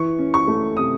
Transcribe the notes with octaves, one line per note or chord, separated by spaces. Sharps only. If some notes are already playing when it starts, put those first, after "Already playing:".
Already playing: E3 C#6
C#4
C#6
A3
C3 D#6